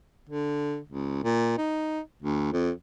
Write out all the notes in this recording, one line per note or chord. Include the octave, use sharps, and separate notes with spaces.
D3
C#2
A#2
D#4
D2
F2